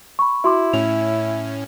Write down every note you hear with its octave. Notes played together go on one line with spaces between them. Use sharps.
B5 C#6
E4 F#4 C6 D6
A2 C#4 F7